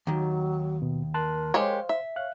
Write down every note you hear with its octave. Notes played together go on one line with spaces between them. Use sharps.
D#2 D#3 F#3
B2
A#4 A5 C6 F#6
G#3 G4 C5 C#5 F5
E5
C#5 F5 F#6